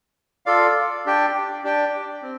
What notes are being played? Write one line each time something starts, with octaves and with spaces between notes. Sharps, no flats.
F4 A4 D5 F5
D4 G4 D5 G5
D4 G4 D5 G5
C4